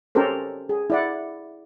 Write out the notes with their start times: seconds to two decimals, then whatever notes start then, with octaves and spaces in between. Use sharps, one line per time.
0.15 C#4 G4 A4 A#4 C5
0.69 G#4
0.90 E4 D5 F#5